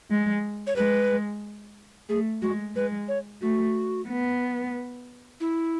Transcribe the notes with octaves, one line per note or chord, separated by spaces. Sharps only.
G#3
C#5
G#3 B4
A3 G#4
G#3 F#4
G#3 B4
C#5
A3 F#4
B3
E4